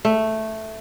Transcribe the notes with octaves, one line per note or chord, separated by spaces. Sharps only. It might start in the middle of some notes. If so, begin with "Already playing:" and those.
A3